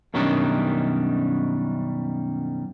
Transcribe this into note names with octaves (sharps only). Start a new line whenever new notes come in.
F#2 B2 D#3 G3 C#4 D4